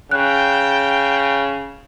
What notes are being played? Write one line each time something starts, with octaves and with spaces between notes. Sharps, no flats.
C#3 G5 F#6